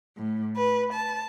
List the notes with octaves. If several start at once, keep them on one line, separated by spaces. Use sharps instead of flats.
A2
B4
A5